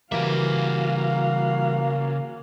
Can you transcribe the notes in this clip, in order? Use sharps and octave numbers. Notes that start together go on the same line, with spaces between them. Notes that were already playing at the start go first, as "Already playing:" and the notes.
C#3 E3 G3 A#3 F#4 E5 F5